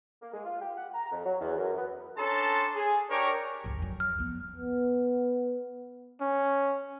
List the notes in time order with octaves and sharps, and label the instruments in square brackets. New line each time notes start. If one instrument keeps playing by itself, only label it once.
[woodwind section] A#3
G#3
F4
G4
F#5
A#5
F2
F#3
E2
F#2
B3
[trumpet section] C#4 D4 A4 A5 A#5 C6
G#4
D4 G4 A#4 C#5 C#6 D6
[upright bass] G1 C#2
F2 F#3
[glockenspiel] F6
[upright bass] F3 B3
[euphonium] B3
[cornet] C#4